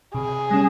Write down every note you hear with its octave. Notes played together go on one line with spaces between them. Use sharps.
C3 G#4
G3 C#4